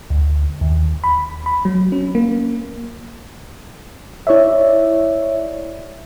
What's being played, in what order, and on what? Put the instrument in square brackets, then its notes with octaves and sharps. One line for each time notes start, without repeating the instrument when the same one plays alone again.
[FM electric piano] D2
D#2
B5
B5
F#3
C#4
A#3
E4 C#5 D5 E5